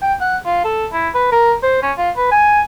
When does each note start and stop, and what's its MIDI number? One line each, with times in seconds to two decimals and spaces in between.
0.02 0.13 79
0.21 0.37 78
0.46 0.63 65
0.64 0.86 69
0.93 1.09 64
1.14 1.29 71
1.32 1.54 70
1.63 1.79 72
1.82 1.92 61
1.97 2.10 65
2.17 2.30 71
2.31 2.61 80